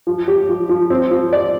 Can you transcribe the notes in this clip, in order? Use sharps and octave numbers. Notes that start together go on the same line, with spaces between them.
F3
G4
F3
F3
C4
F3
D5